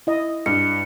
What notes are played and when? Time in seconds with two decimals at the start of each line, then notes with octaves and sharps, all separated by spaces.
0.07 E4 D#5
0.46 G2 C#7